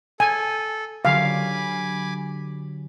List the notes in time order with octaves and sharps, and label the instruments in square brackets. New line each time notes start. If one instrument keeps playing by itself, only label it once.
[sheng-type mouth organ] A4 [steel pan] G#5
[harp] D3 F#3 G4 [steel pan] F5 [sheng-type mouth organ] G#5 B5 D6